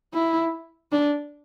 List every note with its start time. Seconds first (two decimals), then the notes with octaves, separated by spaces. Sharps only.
0.14 E4
0.92 D4